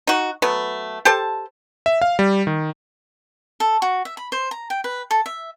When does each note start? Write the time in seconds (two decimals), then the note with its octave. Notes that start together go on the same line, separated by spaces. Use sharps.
0.07 D#4 F#4
0.42 F#3 A3 B3
1.05 G4 A4 C5 A5
1.86 E5
2.02 F5
2.19 G3
2.47 D#3
3.60 A4
3.82 F#4
4.05 E5
4.17 B5
4.32 C5
4.51 A#5
4.70 G5
4.84 B4
5.11 A4
5.26 E5